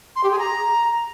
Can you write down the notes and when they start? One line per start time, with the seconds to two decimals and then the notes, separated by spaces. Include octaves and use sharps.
0.16 C6
0.23 G4
0.31 G#4
0.39 A#5